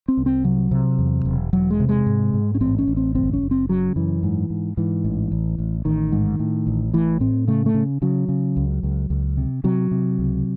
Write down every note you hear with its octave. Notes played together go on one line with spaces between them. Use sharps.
C4
C2
C4
C3 F#3
C3
E2
E1
E1 F#3
G#3
C3
G#3
G#2
G#2
C#4
A1 C4
C#4
A1
C4
F#1 C4
C#4
F#1
C4
C#3 F#3
F#2 E3
G#2
G#2
G#2 E3
A1
A1
A1
A1 D#3
G#2
A2
A1
A2 E3
A2 C4
C#3 A3
A3
C#3
C#3 F#3
C#3
C#2
C#2
C#2
C3
C3 F#3
C3
C#2